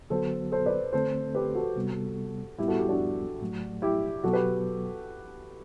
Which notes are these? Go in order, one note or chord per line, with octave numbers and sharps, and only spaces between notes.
D3 F#3 B3 F#4 A4 C5
A4 C5
B4 D5
D3 A3 C4 A4 C5
G4 B4
F#4 A4
C3 G3 B3
A2 G3 B3 E4 G4
F#4 A4
E4 G4
D4 F#4
A2 F#3 A3
E4 G4
B2 F#3 B3 F#4 A4
G4 B4